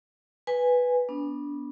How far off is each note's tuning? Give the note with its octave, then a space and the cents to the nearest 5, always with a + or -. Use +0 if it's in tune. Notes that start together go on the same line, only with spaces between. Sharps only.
B4 +0 G#5 -10
B3 -15 D4 -25